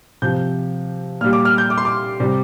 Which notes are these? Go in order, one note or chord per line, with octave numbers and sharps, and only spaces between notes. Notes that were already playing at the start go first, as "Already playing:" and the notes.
C3 F3 G6
A#2 G3 F6
D6
F6
G6
D6
C6
D6
C3 G3